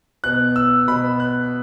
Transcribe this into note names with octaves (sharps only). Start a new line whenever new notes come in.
B2 B3 F#6
E6
B2 B3 B5
F#6